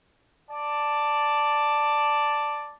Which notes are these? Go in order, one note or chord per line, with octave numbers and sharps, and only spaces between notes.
D5 A5